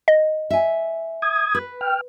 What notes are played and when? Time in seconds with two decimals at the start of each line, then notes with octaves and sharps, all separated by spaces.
0.08 D#5
0.50 E5 G#5
1.22 D#6 G#6
1.55 B4
1.81 G5 F6